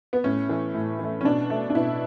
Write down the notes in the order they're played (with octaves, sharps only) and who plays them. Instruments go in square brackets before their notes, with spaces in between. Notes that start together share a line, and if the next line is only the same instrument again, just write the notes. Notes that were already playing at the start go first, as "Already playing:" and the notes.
[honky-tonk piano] B3
A2 C#4
E3 A3
A2
E3 A3
C#4
B2 D4
A3
D4
B2 E4